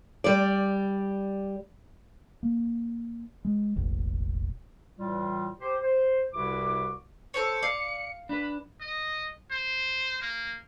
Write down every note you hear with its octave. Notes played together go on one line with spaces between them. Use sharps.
G3 D5
A#3
G#3
E1 A1
A2 E3 G3 F4
G4 C5
C5
C2 C3 E4 F#4 B4 D6
A4 C5 C#5 C#7
D5 F5
D4 B4 B5
D#5
C5
A#3